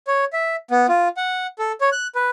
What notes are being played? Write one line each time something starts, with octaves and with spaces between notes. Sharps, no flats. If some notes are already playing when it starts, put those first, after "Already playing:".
C#5
E5
B3
F4
F#5
A4
C#5
F#6
B4